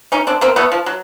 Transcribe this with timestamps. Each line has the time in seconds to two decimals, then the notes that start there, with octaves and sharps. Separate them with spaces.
0.12 C#4 D#4
0.27 C4 D4
0.41 A#3 C4
0.56 A3 B3
0.72 F3
0.86 F#3